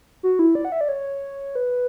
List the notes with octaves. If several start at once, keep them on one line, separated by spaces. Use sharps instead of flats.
F#4
E4
D5
F#5
E5
D5
C#5
B4